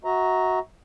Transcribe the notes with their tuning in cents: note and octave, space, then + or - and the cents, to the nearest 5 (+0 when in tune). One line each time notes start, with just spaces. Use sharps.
F#4 +0 E5 -35 A#5 +0